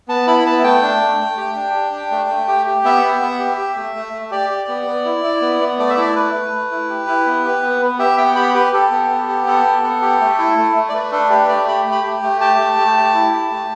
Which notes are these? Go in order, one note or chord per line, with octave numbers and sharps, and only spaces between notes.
B3 A5
E4 B5
B3 A5
A3 G5
D4
A3
A3
G4
D4
G4
D4
A3
A3
G4
G4
B3 E5
B3
B3
G4
G4
A3
A3
A3
G4 D5
G4
B3
B3
E4
E4
B3
B3
A3 D5
E5
E4 D5
A3 B4
A3
A3
E4
G4
E4
B3
G4
B3
B3
G4 E5
B3 G5
G4 B5
G4 B4
G4 A4
B3
B3
G4
B3 A4
B3
B3
G4
A3
E4
A3
A3
D5
A3 B4
D4 A4
G4 B4
A3 D5
G4 B5
A3
B5
G4
A3
G4 A5
A3
A3
G4
E4
G4
A3